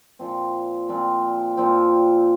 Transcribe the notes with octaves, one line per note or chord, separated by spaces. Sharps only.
A#2 F3 C4
A#2 F3 C4
A#2 F3 C4